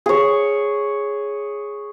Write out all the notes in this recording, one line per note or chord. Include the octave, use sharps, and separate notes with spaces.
G#4 C#5